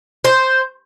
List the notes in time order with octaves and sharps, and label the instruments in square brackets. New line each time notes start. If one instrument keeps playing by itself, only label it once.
[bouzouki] C5